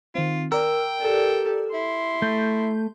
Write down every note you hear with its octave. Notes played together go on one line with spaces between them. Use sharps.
D#3 C4 F4
A#4 D5 G5 E6
G4 A4
E4 C6
A3 G6